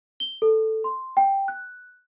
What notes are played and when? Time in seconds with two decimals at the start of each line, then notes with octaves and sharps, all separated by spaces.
0.20 G7
0.42 A4
0.84 C6
1.17 G5
1.48 F#6